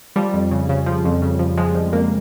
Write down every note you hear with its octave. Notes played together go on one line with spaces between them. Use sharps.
F3 G3
F2
C#3
C#3
F3
F2
C#3
F3
F3 G#3
F3
F2 A#3